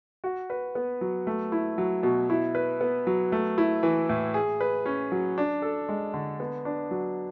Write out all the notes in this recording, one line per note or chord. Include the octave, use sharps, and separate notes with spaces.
F#4
B4
B3
F#3
A3
E4
F#3
B2
E4
B4
B3
F#3
A3
E4
E3
A2
G#4
B4
C#4
F#3
D4
A4
G#3
D3
B3
D4
F#3